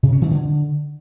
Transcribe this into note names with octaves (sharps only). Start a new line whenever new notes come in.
C3
C#4
D#3
D3